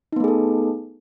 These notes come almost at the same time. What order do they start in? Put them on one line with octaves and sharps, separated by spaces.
D#4 B3 A3 G#4 A4